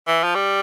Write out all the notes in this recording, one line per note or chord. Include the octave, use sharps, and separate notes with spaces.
E3
F3
G3